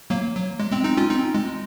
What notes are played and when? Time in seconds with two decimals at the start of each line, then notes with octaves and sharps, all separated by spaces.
0.10 F#3 A#3
0.36 F#3
0.60 G#3
0.72 G#3 C4
0.84 C4 D#4
0.97 C#4 F4
1.09 C4 D#4
1.35 G#3